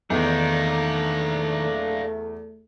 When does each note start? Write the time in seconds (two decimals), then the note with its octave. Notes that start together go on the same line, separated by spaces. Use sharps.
0.10 E2 D#3 A3 A#3 D4 D#4